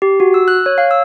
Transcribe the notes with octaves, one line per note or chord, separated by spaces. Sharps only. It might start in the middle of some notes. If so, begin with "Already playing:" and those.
G4
F#4
E6
F#6
C#5
F5
E6